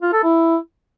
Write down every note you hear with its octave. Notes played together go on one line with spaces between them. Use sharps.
F4
A4
E4